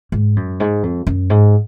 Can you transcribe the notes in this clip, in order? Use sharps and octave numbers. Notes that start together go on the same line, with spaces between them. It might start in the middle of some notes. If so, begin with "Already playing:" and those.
G#2
F#2
G#2
F2
F#2
G#2